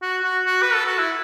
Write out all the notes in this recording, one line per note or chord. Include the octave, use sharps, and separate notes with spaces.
F#4
F#4
F#4
B4
A4
F#4
E4